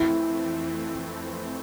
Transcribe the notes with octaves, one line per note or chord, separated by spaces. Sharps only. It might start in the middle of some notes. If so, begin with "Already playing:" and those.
Already playing: F2 E3 A3 C4 E4